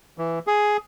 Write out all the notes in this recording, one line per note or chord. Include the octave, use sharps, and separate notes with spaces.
E3
G#4